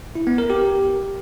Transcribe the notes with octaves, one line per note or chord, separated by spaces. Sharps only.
E4
B3
A#4
G4